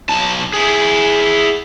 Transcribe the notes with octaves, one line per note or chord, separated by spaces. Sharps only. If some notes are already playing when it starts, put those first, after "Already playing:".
B1 A5
E4 G#4